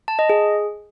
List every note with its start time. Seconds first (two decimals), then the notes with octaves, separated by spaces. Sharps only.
0.08 A5
0.19 D#5
0.30 G#4